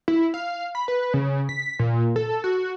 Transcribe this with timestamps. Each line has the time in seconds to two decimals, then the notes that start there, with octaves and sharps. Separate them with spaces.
0.08 E4
0.34 F5
0.75 B5
0.88 B4
1.14 C#3
1.49 B6
1.79 A#2
2.16 A4
2.44 F#4